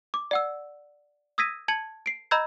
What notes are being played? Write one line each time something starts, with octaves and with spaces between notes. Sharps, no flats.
D6
D5 F#5 E6
D#6 E6 G#6 A#6 B6 D#7
A5 G#6 C#7 F#7
C7 D7
D#5 A#5 B5 E6 G6 G#6